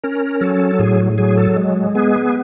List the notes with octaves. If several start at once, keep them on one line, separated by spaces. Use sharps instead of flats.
C#4 A#4
F#3 A4
A2 G#4
F#3 G#4
A4
G#3
B3 G#4